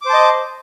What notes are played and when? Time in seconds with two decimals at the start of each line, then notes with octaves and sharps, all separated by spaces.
0.02 D6
0.06 C5
0.10 A5
0.14 D#5